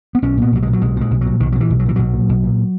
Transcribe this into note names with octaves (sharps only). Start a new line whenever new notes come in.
B3
B1 C#4
A#2 B3
B1 F#3
A#2 G#3
F#3
B1 G#3
A#2 G#3
B1
A#2 F#3
B1 D#3
F#3
A#2
E3
B1
F#3
A#2 E3
B1 F#3
A#2
B1
A#2